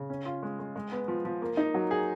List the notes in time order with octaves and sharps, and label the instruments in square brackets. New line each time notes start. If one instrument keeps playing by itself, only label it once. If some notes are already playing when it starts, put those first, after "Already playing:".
Already playing: [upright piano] C#3
C#4
F4
G#3
G#3
G#3
B3
F3
F3
A#3
D#4
F#3
G#4